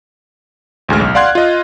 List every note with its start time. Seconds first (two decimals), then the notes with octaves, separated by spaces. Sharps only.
0.89 A1 D2 G#3 F6
1.00 B1
1.15 D5 F5 F#5 C6 F#6 G#6
1.35 F4 D#5